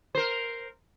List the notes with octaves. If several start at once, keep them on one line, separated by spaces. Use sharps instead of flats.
A#4 C5